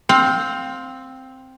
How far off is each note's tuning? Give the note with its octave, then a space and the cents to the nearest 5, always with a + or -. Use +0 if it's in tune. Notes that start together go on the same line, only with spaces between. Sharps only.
C4 +0 F5 +25